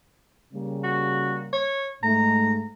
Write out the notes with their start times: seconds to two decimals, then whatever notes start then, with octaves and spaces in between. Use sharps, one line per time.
0.54 C#3 G3 A#3
0.84 F#4
1.53 C#5
2.03 G#2 A3 A#5